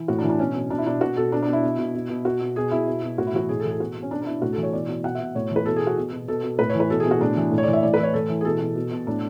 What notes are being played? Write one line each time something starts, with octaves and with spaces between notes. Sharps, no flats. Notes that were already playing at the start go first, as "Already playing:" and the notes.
Already playing: E3
A2 F#4
D4
E3
D4
B2 C#4
B2
B2 D4
E4
B2 D4
B2 F#4
B2 A4
B2 D4
D4
B2
E4
B2
B2
B2
B2
B2 F#4
B2
B2 G#4
B2 E4
B2
B2
A2 F#4
E4
E3 F#4
A2 G#4
E3 A4
G#4
B2 F#4
B2
C#4
B2 D4
D4
B2 E4
A2 F#4
E3 A4
C#5
B2 D5
B2
B2 F#5
B2 E5
A2 C#5
E3
B4
B2 A4
G#4
B2
F#4
B2
B2
B2 A4
B2
A2 B4
C#5
E3
B4
B2 A4
G#4
B2
F#4
A2 D4
E3
A2
C#5
E3 D5
E5
A2 D5
B4
E3 C#5
A2 A4
E3
G#4
B2 A4
B2
B2
B2
A2 D4